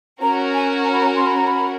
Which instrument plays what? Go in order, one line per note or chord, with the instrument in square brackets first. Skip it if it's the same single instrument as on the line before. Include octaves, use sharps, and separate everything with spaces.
[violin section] C#4 F#4 A#4 [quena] A#5
[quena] G#5
A#5
B5
A#5
C6
B5
A#5
B5